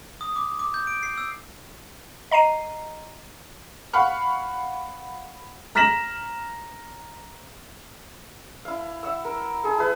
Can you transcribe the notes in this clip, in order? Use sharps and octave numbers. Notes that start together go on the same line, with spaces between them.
D#6
D6
D6
G6
D7
C7
E6
D#5 A#5 C7 D#7
F5 F#5 B5 C#6 F6
A#5 F6 A#6 B6 E7 F#7
E4 F5
E5 F#5 E6
A#4
G#4 A4
E4 G#4 B4 A5